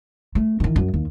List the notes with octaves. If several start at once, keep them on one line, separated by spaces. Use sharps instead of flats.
A3
D#3 E3
F#2
D#2